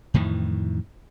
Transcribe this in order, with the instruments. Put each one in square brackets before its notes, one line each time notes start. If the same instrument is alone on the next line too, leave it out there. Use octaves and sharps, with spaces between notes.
[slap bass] F2 A2 D#3 E3